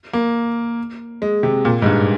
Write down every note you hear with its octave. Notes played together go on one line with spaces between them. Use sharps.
A#3
G#3
C3
A#2
G#2
G2